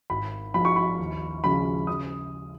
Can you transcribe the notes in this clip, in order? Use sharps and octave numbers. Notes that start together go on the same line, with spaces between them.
G#1 B5
G#2 F3 B5
C#6
B5
D#2
C#3 F3 G#3 C#4 B5
C#3 D#6